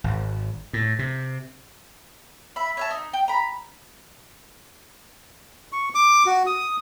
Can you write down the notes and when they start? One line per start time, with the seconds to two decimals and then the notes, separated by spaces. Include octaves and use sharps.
0.04 G#1
0.73 A2
0.99 C3
2.56 E5 B5
2.77 C#5 E5 A5
2.91 D#4
3.13 G5
3.28 A#5 B5
5.72 C#6
5.95 D6
6.26 F#4
6.46 D#6